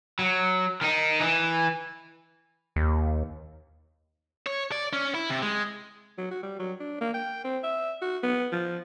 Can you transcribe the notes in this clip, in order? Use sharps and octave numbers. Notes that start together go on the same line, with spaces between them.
F#3
D#3 D#4
E3
D#2
C#5
D5
C#4
E4
C3
G#3
F#3
F#4
G3
F#3
D4
A#3
G5
C4
E5
F#4
B3
F3